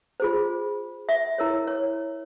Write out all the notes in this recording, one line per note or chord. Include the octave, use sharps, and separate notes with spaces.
F4 G#4 C5
E5
E4 A#4 C#5
C#5